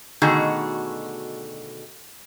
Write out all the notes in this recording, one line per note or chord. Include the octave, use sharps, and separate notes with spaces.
B2 D3 D#3 A3 F#4 G#4